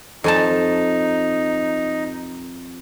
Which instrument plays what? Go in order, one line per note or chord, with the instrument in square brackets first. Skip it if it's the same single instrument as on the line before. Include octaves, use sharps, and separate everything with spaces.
[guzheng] F2 G#5 A5 [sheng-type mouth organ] D#4